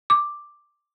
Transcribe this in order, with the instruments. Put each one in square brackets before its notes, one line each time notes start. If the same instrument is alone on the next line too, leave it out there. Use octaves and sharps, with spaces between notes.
[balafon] D6